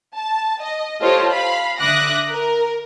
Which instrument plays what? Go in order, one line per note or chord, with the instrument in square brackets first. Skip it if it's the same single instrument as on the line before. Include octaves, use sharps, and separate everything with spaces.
[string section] A5
D#5
F4 G4 A4 C5 C#5 D#5
F5 B5
D3 E5 D6 D#6 F#6 A#6
A#4